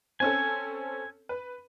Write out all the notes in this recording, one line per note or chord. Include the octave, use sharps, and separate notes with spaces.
C4 C#4 A4 G#5
B4